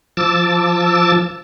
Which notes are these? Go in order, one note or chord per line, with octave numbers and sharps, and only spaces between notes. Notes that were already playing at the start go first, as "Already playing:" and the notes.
F3 A5 D6 E6 A6